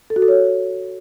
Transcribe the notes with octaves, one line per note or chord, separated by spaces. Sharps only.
A4
F#4
A4
C#5